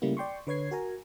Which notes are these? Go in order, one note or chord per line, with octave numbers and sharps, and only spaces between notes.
C#3 G3 A3 A#3 E4
D5 G5 C6 C#6
D3 B4 C#5 G#6 C7
F#4 A#4 G#5 A#5